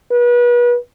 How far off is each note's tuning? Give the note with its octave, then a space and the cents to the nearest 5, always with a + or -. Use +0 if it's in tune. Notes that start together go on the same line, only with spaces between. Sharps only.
B4 -35